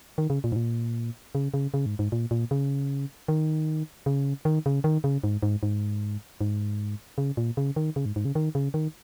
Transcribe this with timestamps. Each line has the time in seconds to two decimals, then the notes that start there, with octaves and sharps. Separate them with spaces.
0.18 D#3
0.30 C#3
0.44 A#2
0.52 G#2
0.56 A#2
1.35 C#3
1.54 C#3
1.74 C#3
1.86 G#2
1.99 G#2
2.12 A#2
2.31 A#2
2.51 C#3
3.28 D#3
4.06 C#3
4.45 D#3
4.66 C#3
4.84 D#3
5.04 C#3
5.24 G#2
5.43 G#2
5.63 G#2
6.41 G#2
7.18 C#3
7.37 A#2
7.57 C#3
7.76 D#3
7.96 C#3
8.05 G#2
8.16 G#2
8.25 C#3
8.35 D#3
8.55 C#3
8.74 D#3